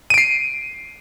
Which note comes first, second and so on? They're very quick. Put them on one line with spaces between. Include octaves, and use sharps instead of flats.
D#7 D7 C7